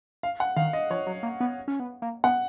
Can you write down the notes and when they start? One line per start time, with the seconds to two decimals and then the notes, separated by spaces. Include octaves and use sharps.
0.23 F5
0.40 F#5
0.56 D#3 F5
0.73 D#5
0.90 F3 C#5
1.07 F#3
1.23 A#3
1.40 B3
1.68 C#4
1.80 B3
2.02 A#3
2.24 B3 F#5